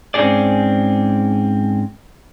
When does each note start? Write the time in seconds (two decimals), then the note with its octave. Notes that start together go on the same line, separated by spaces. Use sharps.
0.14 G#2 C4 C#4 D#4 G#4 D5